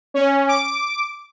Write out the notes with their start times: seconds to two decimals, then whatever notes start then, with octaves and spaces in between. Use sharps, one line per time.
0.14 C#4
0.49 D6